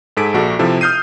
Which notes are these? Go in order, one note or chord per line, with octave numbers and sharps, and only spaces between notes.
G#2 G#4 A4 B6 D7
A#1 F#4 A4
C3 F3 E4 A4
D#6 F6 G6 C7 D#7